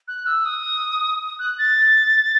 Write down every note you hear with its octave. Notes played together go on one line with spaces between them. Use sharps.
F#6
E6
D#6
F#6
A6